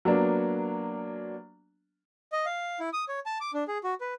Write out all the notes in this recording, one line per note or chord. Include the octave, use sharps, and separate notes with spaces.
F#3 A#3 B3 D4
D#5
F5
E4
D#6
C#5
A5
D6
D4
G#4
F#4
B4